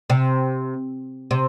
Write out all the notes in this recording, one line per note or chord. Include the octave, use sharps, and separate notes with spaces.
C3
C3